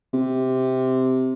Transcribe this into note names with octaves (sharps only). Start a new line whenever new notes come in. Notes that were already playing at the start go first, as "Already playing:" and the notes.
C3